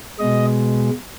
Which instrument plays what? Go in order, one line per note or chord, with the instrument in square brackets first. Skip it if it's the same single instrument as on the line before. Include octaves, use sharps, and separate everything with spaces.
[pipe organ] B2 G#3 D#5